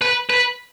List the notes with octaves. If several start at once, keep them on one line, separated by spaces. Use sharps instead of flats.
B4
B4